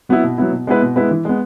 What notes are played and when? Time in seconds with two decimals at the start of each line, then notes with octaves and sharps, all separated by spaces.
0.09 F#3 B3 E4
0.24 B2
0.38 F#3 B3 E4
0.52 B2
0.67 G#3 B3 E4 B4
0.82 B2
0.96 G#3 B3 E4 B4
1.11 E3
1.25 G#3 B3